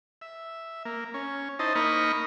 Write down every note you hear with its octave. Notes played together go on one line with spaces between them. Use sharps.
E5
A#3
C#4
D#4 E4 C5 D#5 A5
A#3 D#4 D#5 B5 C#6 F6